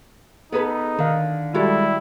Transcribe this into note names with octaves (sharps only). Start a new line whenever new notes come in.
B3 D#4 G#4 A4 B4
D3 D#3 F5
G3 G#3 E4 F#4 G4 A4